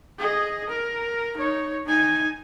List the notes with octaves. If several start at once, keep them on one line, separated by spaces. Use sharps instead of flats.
G#4 D#5
A#4
D#4 C#5
D#4 G#5